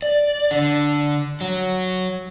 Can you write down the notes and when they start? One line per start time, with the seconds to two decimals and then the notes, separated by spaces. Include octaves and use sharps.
0.02 D5
0.51 D3
1.41 F#3